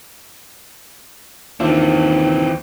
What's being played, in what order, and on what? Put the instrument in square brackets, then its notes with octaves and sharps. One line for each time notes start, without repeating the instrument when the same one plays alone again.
[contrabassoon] D#2 [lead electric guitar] E3 C4 [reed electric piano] D4 F4 E5